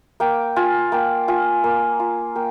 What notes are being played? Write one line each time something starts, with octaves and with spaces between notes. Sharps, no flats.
A#3 G5
F4 G#5
A#3 G5
F4 G#5
A#3
F4
A#3 G5